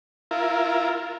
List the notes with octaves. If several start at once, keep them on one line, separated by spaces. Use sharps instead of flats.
E4 F4 A#4